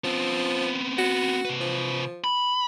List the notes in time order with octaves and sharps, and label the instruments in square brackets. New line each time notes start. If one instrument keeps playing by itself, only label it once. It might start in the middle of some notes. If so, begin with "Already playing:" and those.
[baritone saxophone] F3 [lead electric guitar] B3 C4
[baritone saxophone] F#4
[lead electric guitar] C3 B4
[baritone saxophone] F3
[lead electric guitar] B5